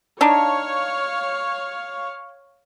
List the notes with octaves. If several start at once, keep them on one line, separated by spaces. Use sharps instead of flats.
D4 D#4 C#5 F5